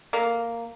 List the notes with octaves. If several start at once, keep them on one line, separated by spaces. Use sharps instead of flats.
A#3